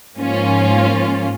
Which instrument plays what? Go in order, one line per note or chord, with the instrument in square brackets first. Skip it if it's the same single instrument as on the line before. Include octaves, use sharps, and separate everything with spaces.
[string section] G#2 F3 A#3 C#4 F4